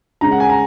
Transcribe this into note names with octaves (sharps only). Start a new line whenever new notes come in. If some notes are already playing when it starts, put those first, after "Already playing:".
C#3 G#3 C#4 A#5
F#5
G#5
A#5